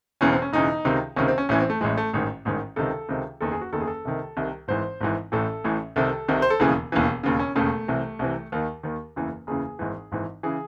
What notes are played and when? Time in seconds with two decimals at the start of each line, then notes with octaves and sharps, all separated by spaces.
0.21 E1 E2 C#3 E3 C#4
0.32 C4
0.42 C#4
0.53 E1 E2 C#3 E3 D#4
0.85 C#2 C3 D#3
1.16 C#2 C3 D#3 C#4
1.28 C4
1.38 C#4
1.49 A1 A2 E3 C#4
1.60 C4
1.70 A3
1.81 A1 A2 E3 G#3
1.97 A3
2.13 A1 G#2 D#3
2.45 A1 G#2 D#3
2.76 C#2 C3 D#3 A4
3.09 C#2 C3 D#3
3.41 F#1 E2 D#3 A4
3.51 G#4
3.61 F#4
3.73 F#1 E2 D#3 A4
3.81 G#4
3.87 A4
4.05 C2 C3 D#3
4.37 C2 C3 D#3
4.68 G#1 G#2 E3 C5
5.01 G#1 G#2 E3
5.32 A1 A2 E3 A4
5.64 A1 A2 E3
5.96 C2 C3 D#3 A4
6.28 C2 C3 D#3
6.42 C5
6.50 A4
6.60 E1 D#2 C#3 E3 G#4
6.92 E1 D#2 C#3 E3
7.23 E1 D#2 C#3
7.39 C#4
7.55 E1 D#2 C#3 A3
7.88 C2 C3 E3
8.19 C2 C3 E3
8.52 D#2 D#3
8.83 D#2 D#3
9.16 F#1 E2 C#3 E3
9.47 F#1 E2 C#3 E3 G#4
9.79 G#1 G#2 E3
10.12 G#1 G#2 E3
10.43 C#3 E3 G#4